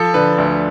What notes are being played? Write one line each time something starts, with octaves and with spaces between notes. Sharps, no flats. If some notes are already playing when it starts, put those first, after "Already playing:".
Already playing: F3 A4
D3 B4
D2